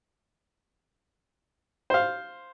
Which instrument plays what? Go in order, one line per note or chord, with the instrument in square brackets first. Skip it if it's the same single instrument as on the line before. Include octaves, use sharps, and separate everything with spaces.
[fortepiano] C5 F5